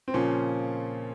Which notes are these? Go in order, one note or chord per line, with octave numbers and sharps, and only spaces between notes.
C4
A#2 C#3 F3 C#4